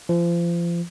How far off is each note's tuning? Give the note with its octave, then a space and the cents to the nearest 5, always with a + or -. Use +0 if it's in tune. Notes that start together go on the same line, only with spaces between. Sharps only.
F3 -30